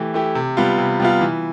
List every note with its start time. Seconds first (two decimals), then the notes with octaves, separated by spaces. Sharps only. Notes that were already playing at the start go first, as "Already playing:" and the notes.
Already playing: E3 A3 E4 G4
0.14 A3 E4 G4
0.35 C3
0.57 G3 B3 F4
0.78 C3
1.00 G3 B3 F4
1.21 E3